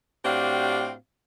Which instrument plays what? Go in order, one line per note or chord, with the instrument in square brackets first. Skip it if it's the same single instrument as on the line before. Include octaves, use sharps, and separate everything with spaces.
[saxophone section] A2 C4 D4 F#4 G4 F5